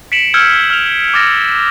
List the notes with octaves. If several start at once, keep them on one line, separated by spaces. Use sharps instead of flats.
B6 C#7 D7 E7 F#7
E6 F6 G6 G#6 C#7
F6 F7
D6 F6 A6 A#6 C#7